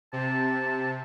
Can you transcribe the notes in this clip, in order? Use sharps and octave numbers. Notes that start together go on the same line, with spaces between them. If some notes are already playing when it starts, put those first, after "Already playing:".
C3 A5